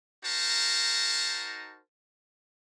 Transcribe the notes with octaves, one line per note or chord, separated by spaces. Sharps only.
D#4 F#4 A#4 C5 A5